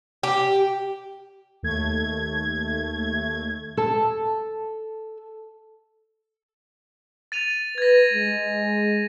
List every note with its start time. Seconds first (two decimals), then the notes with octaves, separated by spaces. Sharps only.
0.23 G4
1.63 D#2 A3 G#6
3.77 A4 A5
7.32 A6 D#7 F7
7.78 B4 G#6 A#6
8.14 G#3